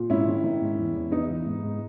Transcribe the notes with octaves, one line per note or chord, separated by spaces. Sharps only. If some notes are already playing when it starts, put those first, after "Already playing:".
Already playing: A#2
G#2 C#4 E4
D#3
D#3
G#2
E2
E2
E2 B3 D#4
E3
G#2
G#2